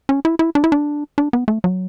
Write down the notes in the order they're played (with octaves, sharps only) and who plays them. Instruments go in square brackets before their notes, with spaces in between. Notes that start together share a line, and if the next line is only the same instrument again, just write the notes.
[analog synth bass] C#4
E4
E4
D4
E4
D4
D4
B3
A3
F#3